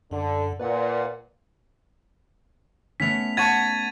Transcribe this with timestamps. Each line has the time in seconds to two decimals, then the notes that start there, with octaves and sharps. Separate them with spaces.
0.11 F#2 D3
0.60 A#2 B4 D5 F#5
3.00 A3 B3 C#4 B6 F7
3.37 F#5 A5 C#6 G#6 A6 D#7